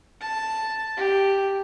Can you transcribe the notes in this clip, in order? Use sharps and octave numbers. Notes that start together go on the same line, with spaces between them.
A5
G4